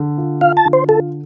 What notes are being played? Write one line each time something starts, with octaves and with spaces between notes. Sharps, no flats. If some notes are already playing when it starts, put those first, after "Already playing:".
Already playing: D3
F4
F4 F5
A5
D3
C5
F4 A4